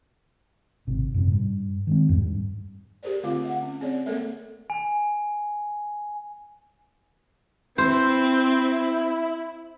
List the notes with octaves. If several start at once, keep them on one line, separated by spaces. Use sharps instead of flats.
G#1 C3
F#2 A2 C3
G2
D#3 G#3 C4
F2 G#2 G3 G#3
G2
G4 G#4 A#4 C5 D5
D3 A3 C4 F4 F5 D6
E5 F#5
C#4
C4 G#4 C#5 D5
A3 A#3 C4 A4 A#4 E5
G#5
C4 E4 C5